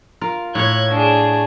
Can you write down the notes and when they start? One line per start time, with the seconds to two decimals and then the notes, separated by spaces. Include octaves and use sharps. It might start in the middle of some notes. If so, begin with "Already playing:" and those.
0.21 F4 A#4
0.55 A2 C#5 F#6 G#6
0.91 D4 G#4